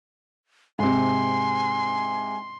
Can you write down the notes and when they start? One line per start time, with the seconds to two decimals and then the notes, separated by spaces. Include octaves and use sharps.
0.79 G#2 C3 G#5 C6